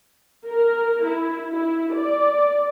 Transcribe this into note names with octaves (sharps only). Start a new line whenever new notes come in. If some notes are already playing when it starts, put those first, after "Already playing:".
A#4
E4
E4
D5